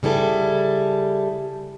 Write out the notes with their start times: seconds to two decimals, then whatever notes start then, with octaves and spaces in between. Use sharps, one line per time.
0.03 C#3 G3 E4 A4